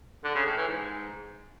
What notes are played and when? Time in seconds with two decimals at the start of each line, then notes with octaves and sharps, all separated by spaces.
0.24 D3
0.35 C#3
0.46 A2
0.57 E3
0.68 G#2